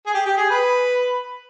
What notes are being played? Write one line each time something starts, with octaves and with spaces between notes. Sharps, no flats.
G#4
G4
G4
G#4
B4